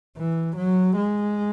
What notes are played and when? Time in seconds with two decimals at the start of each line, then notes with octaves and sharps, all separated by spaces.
0.17 E3
0.56 F#3
0.96 G#3